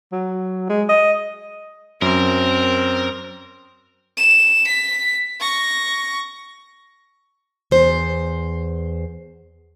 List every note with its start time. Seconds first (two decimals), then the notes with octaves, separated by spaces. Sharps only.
0.12 F#3
0.69 G#3
0.89 D#5
2.02 F#2 C4 A#4
4.17 E7
4.67 B6
5.40 C#6 A#6
7.71 E2 C5